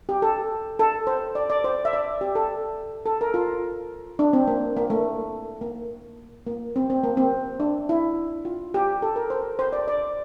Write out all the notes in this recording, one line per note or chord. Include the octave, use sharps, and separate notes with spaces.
G4
A4
A4
C5
D5
D5
C5
E5
D5
G4
A4
A4
A#4
F4
D4
C4
A#3
A#3
A3
A#3
A#3
C4
C4
A#3
C4
D4
E4
F4
G4
A4
A#4
C5
C5
D5
D5